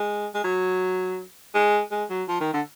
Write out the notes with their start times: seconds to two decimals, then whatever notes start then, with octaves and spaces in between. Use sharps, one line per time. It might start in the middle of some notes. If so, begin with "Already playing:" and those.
Already playing: G#3
0.34 G#3
0.44 F#3
1.54 G#3
1.91 G#3
2.10 F#3
2.28 F3
2.41 D#3
2.53 D3